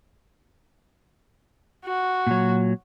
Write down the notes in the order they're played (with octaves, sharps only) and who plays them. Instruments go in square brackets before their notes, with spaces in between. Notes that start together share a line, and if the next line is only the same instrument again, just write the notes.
[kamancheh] F#4
[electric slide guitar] A#2 F#3